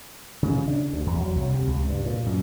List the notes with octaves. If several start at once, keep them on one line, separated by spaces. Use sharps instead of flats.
C#3
D4
D2
E2
F#3
C2
C3
C#2
G2
A#2
F#2